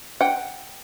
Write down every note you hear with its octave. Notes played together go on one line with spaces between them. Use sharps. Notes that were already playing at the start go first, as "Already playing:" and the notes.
F#5 G5